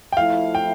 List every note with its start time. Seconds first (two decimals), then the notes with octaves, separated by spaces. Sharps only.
0.12 G5
0.17 F3 A3 E4 F5
0.55 G5